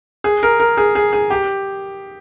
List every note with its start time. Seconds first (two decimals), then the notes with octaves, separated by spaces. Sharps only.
0.24 G#4
0.43 A#4
0.60 A#4
0.77 G#4
0.95 G#4
1.13 G#4
1.30 G4